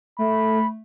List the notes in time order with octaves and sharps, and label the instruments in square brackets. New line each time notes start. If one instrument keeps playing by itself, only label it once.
[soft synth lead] A3 [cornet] B5